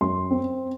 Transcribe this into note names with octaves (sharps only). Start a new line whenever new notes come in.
F#2 C6
C4